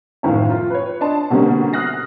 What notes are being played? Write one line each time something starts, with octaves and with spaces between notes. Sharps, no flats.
F#2 A2 D#3 F3 F5
F4
B4 C#5
D4 D#5 A5 C6
B2 D3 G3 A#3 C4 C#4
D#6 F6 F#6 A#6 C7